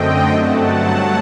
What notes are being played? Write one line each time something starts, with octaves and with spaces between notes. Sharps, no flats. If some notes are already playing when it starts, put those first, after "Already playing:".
Already playing: F#2 D3 A3 C4 D#5 G5
G2 F#3 A3 F#5 A5